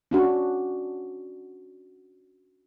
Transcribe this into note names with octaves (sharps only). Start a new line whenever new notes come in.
C#4 D4 F#4